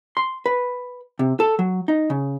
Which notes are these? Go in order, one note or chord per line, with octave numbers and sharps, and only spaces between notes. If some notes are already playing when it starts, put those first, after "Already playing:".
C6
B4
C3
A4
F#3
D#4
C#3